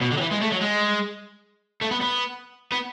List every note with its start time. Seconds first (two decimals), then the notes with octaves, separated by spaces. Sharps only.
0.01 B2
0.12 D3
0.17 F#3
0.21 E3
0.31 G#3
0.42 A3
0.52 F#3
0.61 G#3
1.82 A3
1.91 B3
2.01 B3
2.72 B3